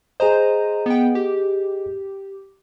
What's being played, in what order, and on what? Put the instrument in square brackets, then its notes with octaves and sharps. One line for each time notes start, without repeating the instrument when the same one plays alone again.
[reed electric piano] G#4 D#5 [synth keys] C5 A#5 D#7
[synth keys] B3 G5
G4